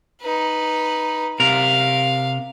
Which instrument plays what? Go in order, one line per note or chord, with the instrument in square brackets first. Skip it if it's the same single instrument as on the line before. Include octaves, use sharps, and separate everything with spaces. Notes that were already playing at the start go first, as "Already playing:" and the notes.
[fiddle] D#4 B4
[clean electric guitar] C3 A#4 [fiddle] F5